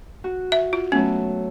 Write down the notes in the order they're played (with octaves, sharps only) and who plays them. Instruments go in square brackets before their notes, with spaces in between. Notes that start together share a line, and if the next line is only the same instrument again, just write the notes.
[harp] F#4
[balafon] E5
F4
[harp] F#3 A3 B3 [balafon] C#4